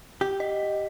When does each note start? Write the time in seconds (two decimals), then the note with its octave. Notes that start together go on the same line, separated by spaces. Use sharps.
0.21 G4
0.40 D#5